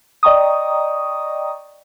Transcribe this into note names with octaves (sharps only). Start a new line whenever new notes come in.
D5 D#5 G5 A#5 C#6 D#6